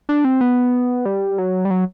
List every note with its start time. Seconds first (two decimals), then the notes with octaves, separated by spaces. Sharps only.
0.09 D4
0.25 C4
0.41 B3
1.05 G3
1.38 F#3
1.65 G3
1.70 F#3